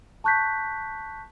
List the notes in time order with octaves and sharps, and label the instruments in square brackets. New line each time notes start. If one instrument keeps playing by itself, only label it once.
[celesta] A5 C#6 F#6 G6 B6